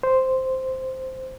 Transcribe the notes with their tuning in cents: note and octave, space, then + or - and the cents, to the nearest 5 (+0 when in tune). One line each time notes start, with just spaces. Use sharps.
C5 -5